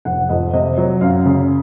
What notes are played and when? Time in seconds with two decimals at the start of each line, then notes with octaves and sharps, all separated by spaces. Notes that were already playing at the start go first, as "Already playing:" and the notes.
0.05 F1 F#5
0.29 F2 D#5
0.53 C3 D#5
0.78 F#3
1.01 F#2 F5
1.25 C#3